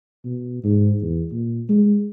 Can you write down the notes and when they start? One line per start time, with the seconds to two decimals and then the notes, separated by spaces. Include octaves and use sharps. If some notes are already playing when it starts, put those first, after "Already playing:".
0.25 B2
0.64 G#2
1.02 E2
1.31 A#2
1.69 G#3